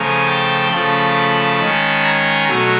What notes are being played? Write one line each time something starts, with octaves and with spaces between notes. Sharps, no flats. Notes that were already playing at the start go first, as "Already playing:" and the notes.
Already playing: C#3 F3 A3 G#5 A#5
G5 A5
C#3 F3 A3 A5 B5
D#3 G#3 C#4
G#5 A#5
B2 F#3 A3 G#5 A#5